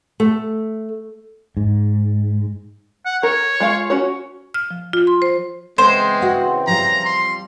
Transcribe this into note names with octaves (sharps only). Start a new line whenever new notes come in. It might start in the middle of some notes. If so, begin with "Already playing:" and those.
A3
G#2
F#5
A#4 C#5
G#3 F4 F5
C#4 F#4 C#5
F6
F3
F4
C6
C5
C#3 E3 G#3 B3 C4 C5
F#4 F#5
F3 G3 F4 A#5
C6